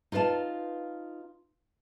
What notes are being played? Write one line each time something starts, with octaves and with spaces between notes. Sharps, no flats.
D#4 F4 B4 F5 A5